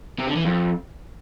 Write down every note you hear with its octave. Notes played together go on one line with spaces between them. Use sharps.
C3
D3
E3
F2